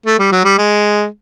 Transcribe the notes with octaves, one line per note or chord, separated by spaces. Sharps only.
A3
G3
F#3
G3
G#3